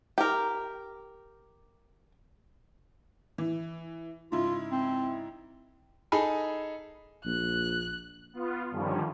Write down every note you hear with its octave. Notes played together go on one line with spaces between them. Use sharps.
G4 A#4
E3
G#2 C#3 E4 F4
C4
D#4 G#4 A4 G#5 B5
A#1 F#6
B3 F4
G2 D3 D#3 F3 G3 C#4